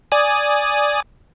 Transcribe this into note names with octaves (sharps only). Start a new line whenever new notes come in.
D5 G#5 D#6